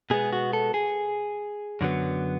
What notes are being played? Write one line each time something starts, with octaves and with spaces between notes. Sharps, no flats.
B2 G#3 B3 G#4
F#4
A4
G#4
F#2 D3 F#3 B3